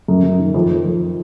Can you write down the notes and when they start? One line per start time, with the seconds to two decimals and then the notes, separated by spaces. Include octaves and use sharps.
0.08 F#2
0.24 F#2
0.39 D#3
0.54 F2
0.70 F2
0.86 F2